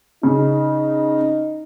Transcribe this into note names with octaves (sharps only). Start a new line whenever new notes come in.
C#3 D#4